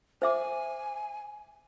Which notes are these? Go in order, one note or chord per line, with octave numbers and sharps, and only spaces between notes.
C5 E5 G#5 D6